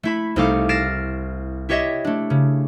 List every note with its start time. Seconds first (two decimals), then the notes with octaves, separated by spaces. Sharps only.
0.03 A3 E4 B5
0.36 C2 A3 D#4 A4 F5 D6
0.69 F6 A6 A#6 C7 D7 E7
1.69 E4 G4 C#5 D#5 E5
2.04 A3 D4
2.30 C#3